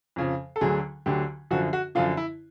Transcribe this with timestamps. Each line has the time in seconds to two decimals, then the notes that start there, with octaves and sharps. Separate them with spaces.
0.16 F2 C#3 F3
0.56 A4
0.61 D2 D3 F#3 G#4
1.06 D2 D3 F#3 G4
1.51 F#2 D3 F3 F#4
1.73 F#4
1.95 F#2 D3 F3 F4
2.17 E4